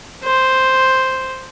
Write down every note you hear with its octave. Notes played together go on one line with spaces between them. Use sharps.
C5